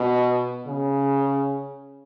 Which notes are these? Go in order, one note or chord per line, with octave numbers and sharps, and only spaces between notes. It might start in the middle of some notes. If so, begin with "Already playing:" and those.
Already playing: B2
C#3